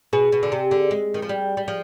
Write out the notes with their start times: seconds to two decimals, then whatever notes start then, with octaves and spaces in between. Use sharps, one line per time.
0.13 B2 G#4
0.32 B2
0.43 D3
0.52 C3
0.71 D3
0.91 G#3
1.14 D#3
1.22 F3
1.29 G3
1.57 G3
1.68 F3